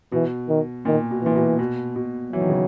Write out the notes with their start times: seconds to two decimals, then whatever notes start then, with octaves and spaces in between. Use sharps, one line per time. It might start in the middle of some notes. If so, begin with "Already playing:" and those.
0.12 B2 E3
0.49 D#3
0.85 A#2 D#3
1.11 B2
1.23 A#2 E3
1.35 B2
1.59 B2
1.96 B2
2.33 E3 F#3
2.41 D#3
2.50 C#3